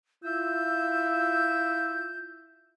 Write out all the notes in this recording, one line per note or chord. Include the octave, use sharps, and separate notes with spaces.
E4 F4 E6 G6